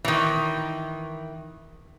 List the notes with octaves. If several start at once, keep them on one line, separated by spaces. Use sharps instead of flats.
D#3 E3